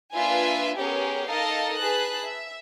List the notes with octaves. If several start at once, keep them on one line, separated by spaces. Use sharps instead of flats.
A#3 D4 F4 B4 E5 G#5
B3 C#4 G4 G#4 A#4 C#5
D#4 A4 A#4 D#5 F5 A5
G#4 B4 A5 F#6
E5